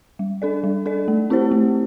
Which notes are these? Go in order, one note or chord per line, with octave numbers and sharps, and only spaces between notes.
G3
D4 A4 D5
G3
D4 A4 D5
A3
C4 E4 G4 C5
A3